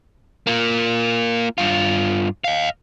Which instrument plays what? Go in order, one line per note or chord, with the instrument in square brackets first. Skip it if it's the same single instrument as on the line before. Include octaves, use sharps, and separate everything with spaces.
[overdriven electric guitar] A#3 F4
G2 F4
D#5 F5